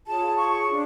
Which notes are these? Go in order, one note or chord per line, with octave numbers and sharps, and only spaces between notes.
F4 G#4 C#5 A5
C#6
D4